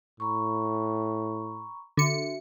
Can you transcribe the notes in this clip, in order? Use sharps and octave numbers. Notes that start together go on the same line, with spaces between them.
A2 A#5 B5 C#6
D3 F#4 E5 C#7